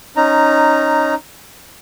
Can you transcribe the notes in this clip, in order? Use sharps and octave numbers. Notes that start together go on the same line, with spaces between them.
C#4 D#4 A#5